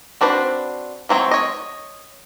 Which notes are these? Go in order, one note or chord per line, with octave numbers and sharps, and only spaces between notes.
C4 D4 F#4 B4 C5
E3 F#3 C4 C#5
C#5 D#5